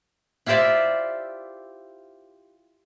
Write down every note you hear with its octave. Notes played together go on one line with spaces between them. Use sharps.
E4 F4 G4 C5 D5 E5